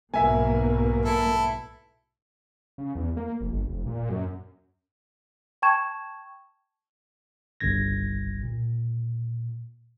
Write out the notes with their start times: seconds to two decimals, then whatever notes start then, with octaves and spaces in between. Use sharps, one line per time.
0.14 B1 G#2 B2 A#3 E5 G#5
1.05 E4 A4
2.78 C#3
2.95 E2
3.17 A#3
3.41 F1
3.52 G1
3.70 F1
3.86 A#2
4.09 F#2
5.62 G5 A5 C#6 G#6 E7
7.60 G1 C2 G#6 A#6
8.43 A#2